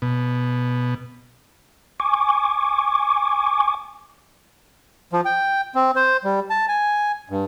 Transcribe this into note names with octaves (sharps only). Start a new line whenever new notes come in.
B2
G#5 C#6 D6
F3
G5
C4
C5
G3
A5
G#5
G2